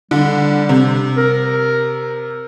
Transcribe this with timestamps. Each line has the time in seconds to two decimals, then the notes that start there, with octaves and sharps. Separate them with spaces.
0.11 D3 G3
0.69 C3
1.17 A#4